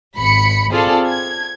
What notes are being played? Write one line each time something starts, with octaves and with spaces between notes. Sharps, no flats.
G#1 B5 C#7
C4 F4 G#4 A4 D5
G#6